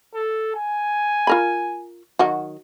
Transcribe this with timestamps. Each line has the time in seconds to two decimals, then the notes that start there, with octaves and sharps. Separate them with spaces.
0.15 A4
0.55 G#5
1.27 F4 A#4 B5
2.19 D#3 F#3 F#4